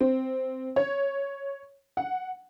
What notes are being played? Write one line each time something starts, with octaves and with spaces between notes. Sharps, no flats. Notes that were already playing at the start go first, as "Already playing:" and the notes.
C4
C#5
F#5